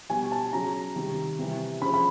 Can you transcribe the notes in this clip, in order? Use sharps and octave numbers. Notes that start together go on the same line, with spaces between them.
B2 G3 G#5
A5
C#3 F#3 A#5
C3 D#3 G3
C3 E3 G3
C#3 F3 B5
B5